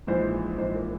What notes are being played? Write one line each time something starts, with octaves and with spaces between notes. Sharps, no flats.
A#1 G#2 E3 C5
A#1 G#2 E3 C5
A#4